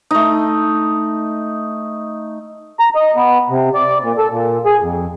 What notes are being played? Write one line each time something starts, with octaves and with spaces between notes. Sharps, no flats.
A3 D#4
A#5
D#5
B3
C3
D5
A#2
A4
A#2
G#4
F2